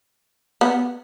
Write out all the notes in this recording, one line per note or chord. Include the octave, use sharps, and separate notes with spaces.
B3